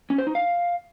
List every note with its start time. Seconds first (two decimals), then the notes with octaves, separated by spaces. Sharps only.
0.10 C#4
0.18 C5
0.27 D#4
0.35 F5